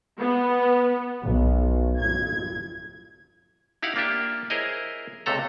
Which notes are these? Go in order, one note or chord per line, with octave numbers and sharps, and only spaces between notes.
B3
B1
G#6
D#4 E4 G4 F5 F#5
A#3 D4 F4 G4 E5
E4 G#4 A#4 C5 C#5 D#5
C#2 C3 A3 A4 A#5